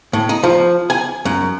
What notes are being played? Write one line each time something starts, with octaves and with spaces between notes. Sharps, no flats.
A2
D#4
F3
G#5
F#2